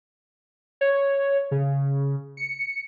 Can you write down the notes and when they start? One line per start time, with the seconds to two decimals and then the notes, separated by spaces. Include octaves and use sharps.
0.81 C#5
1.51 C#3
2.37 C#7